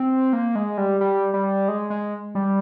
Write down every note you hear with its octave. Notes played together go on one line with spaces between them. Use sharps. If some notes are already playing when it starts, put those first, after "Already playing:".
Already playing: C4
A#3
G#3
G3
G3
G3
G#3
G#3
G3